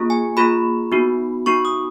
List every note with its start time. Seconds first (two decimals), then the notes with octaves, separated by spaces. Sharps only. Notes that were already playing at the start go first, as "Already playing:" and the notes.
Already playing: A#3 F4 G#4
0.10 G#5
0.37 A#3 F4 G#4 B5
0.92 B3 D#4 F#4
1.46 B3 D#4 F#4 C#6
1.65 D#6